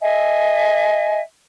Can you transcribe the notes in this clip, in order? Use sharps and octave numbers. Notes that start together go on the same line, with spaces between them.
D#5 E5 G#5